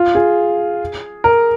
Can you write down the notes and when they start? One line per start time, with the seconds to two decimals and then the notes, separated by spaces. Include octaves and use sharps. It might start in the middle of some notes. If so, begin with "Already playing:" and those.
Already playing: F4
0.15 G#4
1.24 A#4